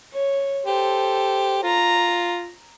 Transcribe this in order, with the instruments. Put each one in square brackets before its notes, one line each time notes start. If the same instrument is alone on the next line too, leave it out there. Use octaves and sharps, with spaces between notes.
[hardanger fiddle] C#5
[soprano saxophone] G4 [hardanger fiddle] A4 C5
[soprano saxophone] F4 [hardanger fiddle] A#5